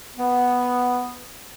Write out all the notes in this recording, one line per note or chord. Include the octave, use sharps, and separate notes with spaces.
B3